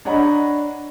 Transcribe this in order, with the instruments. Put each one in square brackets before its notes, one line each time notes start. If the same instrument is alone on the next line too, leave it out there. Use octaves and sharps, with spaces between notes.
[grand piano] D4 C#5 D#5 F#5 A#5 B5